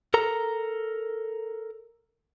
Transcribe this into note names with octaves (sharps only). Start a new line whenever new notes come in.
A4 A#4 A#5